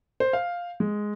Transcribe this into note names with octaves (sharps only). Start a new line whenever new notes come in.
C5
F5
G#3